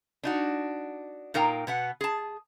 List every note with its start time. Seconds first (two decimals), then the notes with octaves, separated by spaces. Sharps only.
0.23 D4 D#4 F#4
1.34 A#2 D#4 A#4 F5 G5
1.67 B2 B3 F#5
2.01 G#4 A5